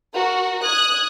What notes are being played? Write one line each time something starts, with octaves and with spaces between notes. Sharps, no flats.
F#4 A#4
D#6 F#6 G#6